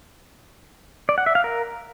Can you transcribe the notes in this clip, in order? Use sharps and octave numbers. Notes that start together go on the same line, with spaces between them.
D5
F#5
E5
F5
A#4